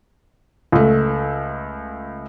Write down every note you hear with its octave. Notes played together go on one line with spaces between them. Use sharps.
C#2 A3